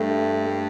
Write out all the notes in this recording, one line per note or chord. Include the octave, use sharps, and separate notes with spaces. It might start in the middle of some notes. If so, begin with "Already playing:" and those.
Already playing: G2 A3